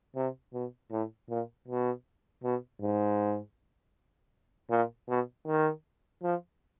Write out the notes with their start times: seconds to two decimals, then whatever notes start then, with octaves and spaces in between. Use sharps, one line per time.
0.16 C3
0.53 B2
0.91 A2
1.29 A#2
1.68 B2
2.44 B2
2.82 G#2
4.70 A#2
5.09 B2
5.47 D#3
6.23 F3